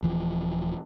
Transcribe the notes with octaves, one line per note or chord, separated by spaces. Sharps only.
D#1 E3 F3